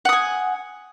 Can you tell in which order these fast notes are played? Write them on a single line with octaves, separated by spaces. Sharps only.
F#5 D#6 G#5